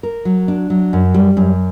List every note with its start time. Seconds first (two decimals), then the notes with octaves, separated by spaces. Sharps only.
0.03 A#4
0.25 F#3
0.48 D4
0.70 F#3
0.93 F#2
1.14 G3
1.37 F#2